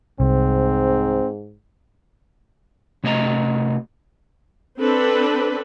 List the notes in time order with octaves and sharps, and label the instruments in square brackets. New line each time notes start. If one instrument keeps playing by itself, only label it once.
[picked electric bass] C2 [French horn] G#2 [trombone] C4
[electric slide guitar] C3 A3 F#4 D#5 G#5 A#5
[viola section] C4 D4 A4 B4